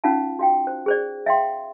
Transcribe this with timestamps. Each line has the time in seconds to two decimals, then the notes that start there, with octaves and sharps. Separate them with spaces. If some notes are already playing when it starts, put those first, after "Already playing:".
0.04 C#4 D#4 F4 F5 F#5 A5
0.39 F#4 F5 G5
0.67 C5
0.86 G#4 C5 D5
1.26 E5 F5 G5 C6